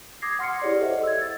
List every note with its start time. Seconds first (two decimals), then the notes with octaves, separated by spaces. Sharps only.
0.22 D6 D#6 G#6 A#6 C7
0.39 F#5 C6 F6 C7 C#7
0.62 E4 G4 G#4 C#5 D5
0.79 A4 C5 D#5 E5 F#5
1.03 E6 G#6
1.19 E6 A6